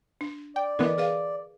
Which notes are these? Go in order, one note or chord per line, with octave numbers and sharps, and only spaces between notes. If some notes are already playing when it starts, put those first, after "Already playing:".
D4
D5 G5
D3 E3 B3 A#4 B4 D#5
G#4 B4 F5